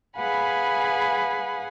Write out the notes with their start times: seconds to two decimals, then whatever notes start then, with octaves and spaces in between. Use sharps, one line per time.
0.16 G#4 B4 F5 F#5 G#5 B5